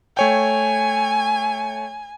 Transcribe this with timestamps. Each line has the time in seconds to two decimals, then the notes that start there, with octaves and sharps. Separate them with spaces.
0.17 A3 C#5 G5 G#5